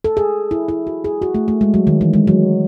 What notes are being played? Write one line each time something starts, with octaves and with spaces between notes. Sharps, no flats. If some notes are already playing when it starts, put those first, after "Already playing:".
A4
G#4
E4
E4
F#4
G#4
F#4
A3
A3
G#3
F#3
D#3
E3
G#3
F#3